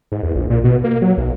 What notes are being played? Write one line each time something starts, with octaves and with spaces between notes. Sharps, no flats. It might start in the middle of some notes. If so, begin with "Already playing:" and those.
G#2
E2
A#1
A#2
B2
A#3
F#3
B1